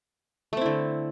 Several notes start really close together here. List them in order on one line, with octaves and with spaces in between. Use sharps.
A3 C4 E4 D3